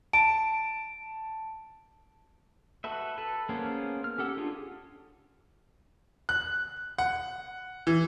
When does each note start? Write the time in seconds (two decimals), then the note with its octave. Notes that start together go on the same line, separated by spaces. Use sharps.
0.13 A5 D7
2.84 F#4 A4 B4 E5
3.18 A4 B4
3.49 A#3 B3 C#4 G#4 C5
4.04 F6
4.18 C#4 G4 A4 F#5 E6
4.37 D4 F4 G4 G#4
6.29 F#6
6.98 F#5
7.87 E3